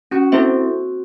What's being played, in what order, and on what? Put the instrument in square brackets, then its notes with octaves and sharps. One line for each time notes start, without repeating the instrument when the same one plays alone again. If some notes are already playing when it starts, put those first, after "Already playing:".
[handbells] C#4 [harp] F#4
[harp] C4 [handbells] E4 A4 C5 E5